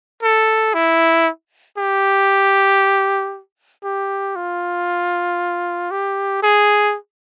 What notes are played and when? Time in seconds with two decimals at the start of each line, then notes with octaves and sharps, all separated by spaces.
0.23 A4
0.74 E4
1.78 G4
3.84 G4
4.36 F4
5.91 G4
6.43 G#4